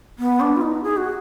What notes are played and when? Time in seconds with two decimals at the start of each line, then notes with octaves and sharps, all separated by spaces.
0.19 B3
0.40 D4
0.56 F4
0.61 D#4
0.84 G#4
0.97 F#4